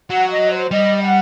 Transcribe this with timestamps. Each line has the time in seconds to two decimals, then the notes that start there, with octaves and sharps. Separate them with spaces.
0.09 F#3 F#5
0.31 D#5
0.51 C5
0.71 G3 D#5
1.02 F#5